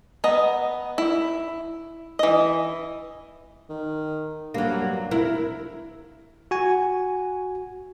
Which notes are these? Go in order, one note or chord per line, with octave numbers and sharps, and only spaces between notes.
B3 D#5 A#5
E4
E3 D#5
D#3
G2 F#3 A#3
F1 E4 A#4
F#4 G#5